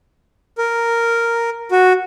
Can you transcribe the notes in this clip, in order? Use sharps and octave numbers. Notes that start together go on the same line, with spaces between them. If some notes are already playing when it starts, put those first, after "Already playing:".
A#4
F#4